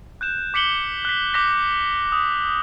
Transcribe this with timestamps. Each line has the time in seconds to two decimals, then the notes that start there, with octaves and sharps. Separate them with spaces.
0.21 F#6 G6 E7
0.54 D6 B6 C#7 F#7 G7
1.05 F#6 B6
1.34 D6 F#6 G6 A#6 B6
2.12 D#6